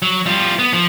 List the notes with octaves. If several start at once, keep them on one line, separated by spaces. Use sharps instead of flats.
F#3
G3 F4
B3
F3